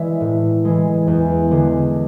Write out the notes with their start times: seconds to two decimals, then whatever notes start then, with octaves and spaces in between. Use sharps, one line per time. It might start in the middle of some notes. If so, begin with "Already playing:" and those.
Already playing: E3 G#3 D5 E5
0.21 A2
0.65 E3 G#3
1.07 E2
1.51 D3 G#3